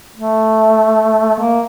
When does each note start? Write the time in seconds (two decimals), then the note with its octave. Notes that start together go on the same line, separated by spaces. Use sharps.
0.15 A3
1.39 A#3